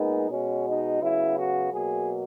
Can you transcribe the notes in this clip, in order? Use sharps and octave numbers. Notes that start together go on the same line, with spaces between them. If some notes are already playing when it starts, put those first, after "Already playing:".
Already playing: A#2 G#3 B3 D#4
B2 G#3 B3 C#4
D#4
C#3 F#3 B3 E4
F#4
B2 F#3 A#3 G#4